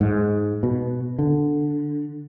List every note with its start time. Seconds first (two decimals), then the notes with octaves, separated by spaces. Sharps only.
0.01 G#2
0.63 B2
1.19 D3